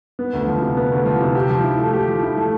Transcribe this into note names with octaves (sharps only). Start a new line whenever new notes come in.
B3
D2
F3
C3
B3
D2
F3
C3
G4
F3
E4
A3
G4
F3
E4
A3